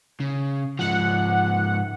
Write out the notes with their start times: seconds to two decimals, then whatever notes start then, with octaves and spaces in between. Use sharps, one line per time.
0.20 C#3
0.79 G#2 F3 F#5